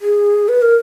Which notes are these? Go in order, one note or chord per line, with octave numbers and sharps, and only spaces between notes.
G#4
B4
A#4